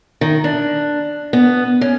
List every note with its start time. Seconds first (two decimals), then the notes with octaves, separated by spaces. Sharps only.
0.21 D#3
0.44 D4
1.33 B3
1.81 C#4